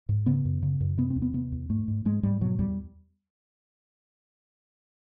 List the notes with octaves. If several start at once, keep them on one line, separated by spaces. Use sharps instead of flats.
G#2
C#3 B3
F#2
C#3
F#2
C3 B3
C4
E2
B3
C3 B3
E2
G#2 A3
G#2
G#2 G#3
G#2 G3
B2 F#3
E2 G3